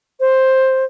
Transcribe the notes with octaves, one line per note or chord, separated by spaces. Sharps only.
C5